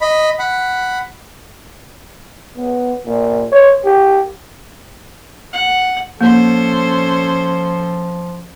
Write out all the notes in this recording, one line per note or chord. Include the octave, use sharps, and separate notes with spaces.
D#5 B5
F#5 B5
B3
A#2
C#5
G4
F#5
F3 A#3 C#4 A4 C5